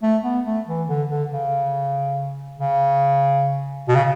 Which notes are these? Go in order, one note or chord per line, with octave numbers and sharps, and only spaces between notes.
A3
B3
A3
E3
D3
D3
C#3
C#3
B2
C#3